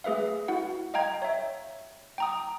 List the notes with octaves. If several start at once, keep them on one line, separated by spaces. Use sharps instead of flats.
A3 G#4 B4 E5 F5
E4 F#4 F#5
D#5 F5 G5 A#5 G#6
C#5 E5
G5 A#5 D#6